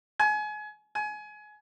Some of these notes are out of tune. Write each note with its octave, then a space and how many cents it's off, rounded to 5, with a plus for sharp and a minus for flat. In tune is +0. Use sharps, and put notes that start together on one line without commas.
G#5 +30
G#5 +25